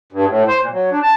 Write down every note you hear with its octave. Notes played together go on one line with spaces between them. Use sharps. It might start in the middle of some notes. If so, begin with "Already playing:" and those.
G2
A2
C5
A#2
F#3
D4
A5